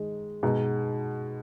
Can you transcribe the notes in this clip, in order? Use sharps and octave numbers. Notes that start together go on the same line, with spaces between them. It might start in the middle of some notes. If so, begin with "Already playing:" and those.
Already playing: D#3 G#3 D#5
B2 G#3 D#4